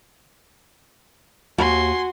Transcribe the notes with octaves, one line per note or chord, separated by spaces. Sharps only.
D#2 F#4 G#5 C6